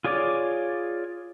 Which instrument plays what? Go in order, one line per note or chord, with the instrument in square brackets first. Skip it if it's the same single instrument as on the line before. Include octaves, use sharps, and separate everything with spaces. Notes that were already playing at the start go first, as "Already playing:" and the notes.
[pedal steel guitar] F4 G#4 C#5 D5 D6